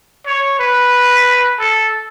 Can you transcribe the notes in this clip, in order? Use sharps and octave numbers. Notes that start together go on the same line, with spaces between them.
C#5
B4
A4